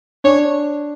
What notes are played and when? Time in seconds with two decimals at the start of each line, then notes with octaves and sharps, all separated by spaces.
0.24 D4 C#5